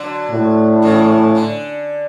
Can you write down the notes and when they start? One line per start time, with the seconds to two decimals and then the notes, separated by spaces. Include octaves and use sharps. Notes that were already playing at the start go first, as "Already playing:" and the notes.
Already playing: D3 F#3
0.31 A2
0.82 C#3 E3
1.35 D3